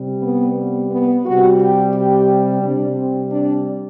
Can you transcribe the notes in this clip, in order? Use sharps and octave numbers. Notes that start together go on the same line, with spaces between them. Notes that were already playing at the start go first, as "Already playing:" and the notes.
Already playing: C3 G3
B3
B3
B3
C3 G3 F#4
G4
G4
C3 G3 D4
C4
D4